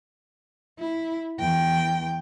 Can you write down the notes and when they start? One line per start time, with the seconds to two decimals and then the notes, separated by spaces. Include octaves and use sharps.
0.79 E4
1.40 E2 G5